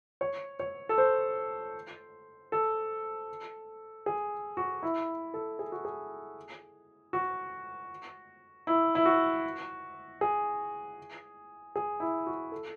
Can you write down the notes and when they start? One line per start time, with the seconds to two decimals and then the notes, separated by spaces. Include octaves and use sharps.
0.21 C#5
0.60 C#5
0.89 A4
0.98 C5
2.52 A4
4.06 G#4
4.57 F#4
4.83 E4
5.34 A4
5.59 G#4
5.72 F#4
5.85 G#4
7.13 F#4
8.67 E4
8.95 E4
9.06 F#4
10.21 G#4
11.76 G#4
12.00 E4
12.27 F#4
12.52 A4